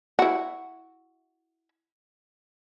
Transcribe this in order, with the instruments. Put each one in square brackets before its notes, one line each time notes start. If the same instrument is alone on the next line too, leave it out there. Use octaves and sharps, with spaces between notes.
[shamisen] E4 F#4